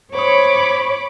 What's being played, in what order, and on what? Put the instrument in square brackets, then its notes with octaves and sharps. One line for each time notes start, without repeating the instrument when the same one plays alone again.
[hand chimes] C5 D#6 [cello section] C#5 [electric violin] B5 D6